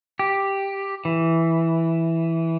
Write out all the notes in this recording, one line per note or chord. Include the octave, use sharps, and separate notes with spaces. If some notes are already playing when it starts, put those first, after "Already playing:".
G4
E3